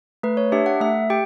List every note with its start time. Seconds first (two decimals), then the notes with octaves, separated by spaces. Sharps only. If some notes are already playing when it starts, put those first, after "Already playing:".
0.23 A3 B4
0.37 C#5
0.52 D4 G4 E5
0.66 F#5
0.81 A3 E5
1.10 G4 G5